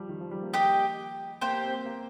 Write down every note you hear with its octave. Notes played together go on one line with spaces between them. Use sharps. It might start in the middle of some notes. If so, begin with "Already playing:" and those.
Already playing: F3 G3
D#3
F3
G3
A#3
G4 D#5 G5
A#3 G4 C5 G5
C4
A#3